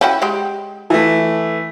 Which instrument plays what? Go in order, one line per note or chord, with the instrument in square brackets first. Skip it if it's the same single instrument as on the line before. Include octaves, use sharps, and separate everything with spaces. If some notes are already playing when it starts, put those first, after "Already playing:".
[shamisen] C#4 E4 F#4 [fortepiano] G5
[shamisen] G#3 G4
[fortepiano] E3 A3